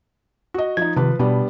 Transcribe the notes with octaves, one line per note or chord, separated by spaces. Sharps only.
F#4 D#5
F3 D#4 G#6
C3 D#3 F3 B4
B2 G3 B3 D4